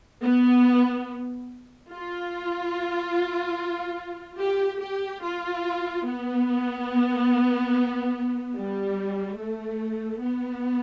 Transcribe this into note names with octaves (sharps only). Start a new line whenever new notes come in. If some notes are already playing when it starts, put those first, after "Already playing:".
B3
F4
G4
G4
F4
B3
G3
A3
B3